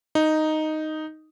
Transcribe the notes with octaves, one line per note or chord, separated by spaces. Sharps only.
D#4